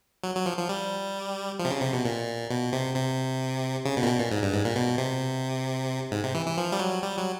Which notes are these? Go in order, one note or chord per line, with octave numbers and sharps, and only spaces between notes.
F#3
F#3
F3
F3
G3
F3
C3
C#3
C3
B2
A#2
B2
C3
C3
C#3
B2
A#2
B2
A#2
G#2
G2
G#2
A#2
B2
C3
G#2
C3
E3
E3
F3
G3
F#3
G3
F#3